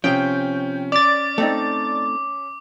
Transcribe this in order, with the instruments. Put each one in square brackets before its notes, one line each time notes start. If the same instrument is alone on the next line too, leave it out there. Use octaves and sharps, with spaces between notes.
[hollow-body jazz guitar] C3 F3 [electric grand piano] C#4 [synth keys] G5
[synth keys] D5 A6 [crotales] D6
[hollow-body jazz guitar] A3 C4 D#4